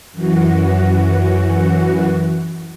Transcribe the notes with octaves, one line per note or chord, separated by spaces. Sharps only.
F#2 E3 F#4